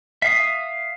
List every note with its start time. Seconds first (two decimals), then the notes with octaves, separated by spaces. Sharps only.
0.22 E5 F5 D#6